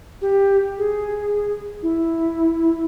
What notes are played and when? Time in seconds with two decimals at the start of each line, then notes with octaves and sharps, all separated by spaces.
0.22 G4
0.78 G#4
1.83 E4